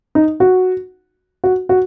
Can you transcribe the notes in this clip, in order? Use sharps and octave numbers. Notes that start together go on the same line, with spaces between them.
D#4
F#4
F#4
F#4